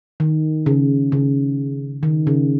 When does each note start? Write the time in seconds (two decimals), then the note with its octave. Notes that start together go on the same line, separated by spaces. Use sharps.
0.20 D#3
0.66 C#3
1.12 C#3
2.03 D#3
2.27 C#3